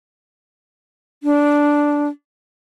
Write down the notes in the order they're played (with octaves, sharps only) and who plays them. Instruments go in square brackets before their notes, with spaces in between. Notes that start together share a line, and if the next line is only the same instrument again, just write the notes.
[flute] D4